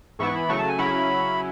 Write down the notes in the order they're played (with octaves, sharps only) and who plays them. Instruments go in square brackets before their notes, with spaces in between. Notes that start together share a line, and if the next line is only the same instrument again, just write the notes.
[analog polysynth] G#2 E3 B3 E4 [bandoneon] C#6
[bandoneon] B5
[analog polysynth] C#3 F#3 A3 [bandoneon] C#6
[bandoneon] A5
G#5
[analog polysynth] C#3 F#3 C#4 E4 [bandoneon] B5